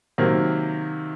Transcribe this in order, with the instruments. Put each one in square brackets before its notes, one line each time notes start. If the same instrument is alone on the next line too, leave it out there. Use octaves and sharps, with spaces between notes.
[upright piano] C3 D#3 F#3 A#3